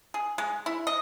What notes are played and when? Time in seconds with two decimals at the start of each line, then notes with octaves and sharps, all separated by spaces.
0.14 G#4
0.38 G#3
0.66 E4
0.87 D#5